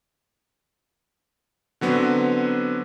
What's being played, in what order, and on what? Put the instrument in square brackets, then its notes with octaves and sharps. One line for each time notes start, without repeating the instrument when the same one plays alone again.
[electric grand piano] D3 F#3 B3 C4